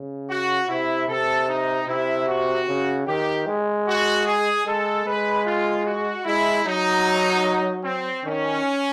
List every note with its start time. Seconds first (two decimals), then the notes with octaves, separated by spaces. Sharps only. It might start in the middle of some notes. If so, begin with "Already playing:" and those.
Already playing: C#3
0.29 F#4
0.69 C3 E4
1.09 C3 A4
1.49 D#4
1.88 C3 E4
2.27 F#4
2.68 C#3
3.07 D#3 G4
3.47 G#3
3.87 F#4
4.26 G#4
4.66 G#3 A4
5.06 G#3 B4
5.46 F4
5.86 F#4
6.25 G#3 E4
6.65 F#3 D#4
7.84 C4
8.24 D#3 C#4